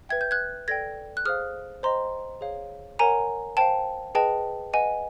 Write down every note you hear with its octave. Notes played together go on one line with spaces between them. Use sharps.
B4 E5 G5 G#6
G6
F#6 G#6
A4 D5 G5 G#6 A#6
F#6
G#4 C5 F5 D#6 F6
C5 D#5 G5 A#5 C6
G#4 C#5 F5
A#4 C#5 F#5 G#5 A#5
C5 F5 G5 A5
G#4 B4 D#5 G5 A5
B4 D#5 F#5 G#5